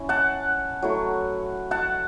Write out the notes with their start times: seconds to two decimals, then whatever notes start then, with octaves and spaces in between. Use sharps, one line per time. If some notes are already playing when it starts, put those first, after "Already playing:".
Already playing: C#4 E4
0.09 F#5 A5
0.82 F#3 A3 E4
1.71 F#5 A5